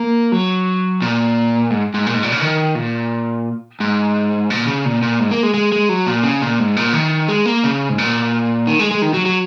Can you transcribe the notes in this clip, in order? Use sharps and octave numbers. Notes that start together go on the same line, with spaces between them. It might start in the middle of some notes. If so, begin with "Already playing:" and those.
Already playing: A#3
F#3
A#2
G#2
G#2
A#2
G#2
A#2
C#3
D#3
A#2
G#2
A#2
C#3
A#2
A#2
G#2
A#3
G#3
G#3
G#3
F#3
A#2
C#3
A#2
G#2
A#2
D#3
G#3
A#3
C#3
G#2
A#2
D#3
G#3
G#3
D#3
F#3
F#3